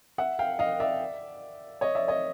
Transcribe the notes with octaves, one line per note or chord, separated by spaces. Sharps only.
E5 F#5
F5 G5
D#5 F5
D5 E5
C#5 D#5
D5 E5
C#5 D#5